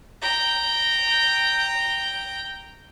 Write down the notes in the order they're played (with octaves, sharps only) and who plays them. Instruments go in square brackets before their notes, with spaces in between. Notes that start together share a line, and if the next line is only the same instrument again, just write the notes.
[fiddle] G5 A#5